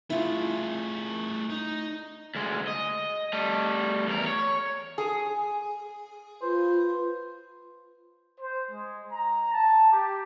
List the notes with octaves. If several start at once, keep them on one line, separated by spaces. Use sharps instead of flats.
A3 E4 F4 G#4
D#4
D2 G#3
D#5
G3 A3
E2 A#4
C#5
G#4
F4 B4 C5
C5
G#3
A#5
A5
G4